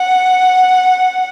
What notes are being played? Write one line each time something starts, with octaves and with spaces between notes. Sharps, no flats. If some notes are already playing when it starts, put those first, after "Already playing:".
Already playing: F#5